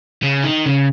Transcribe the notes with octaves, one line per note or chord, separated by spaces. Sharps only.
C#3
D#3
C#3